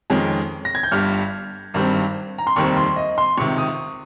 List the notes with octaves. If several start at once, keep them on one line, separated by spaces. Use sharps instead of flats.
F2 D#3 G#3 C#4
A#6
G#6
G6
G1 G2 G3 F6
G#1 G2 D#3 G3 C4
A#5
C6
F1 D#2 D#3 G3 C4 C#6
C6
D#5
C6
C#2 C3 D#3 C#6
D#6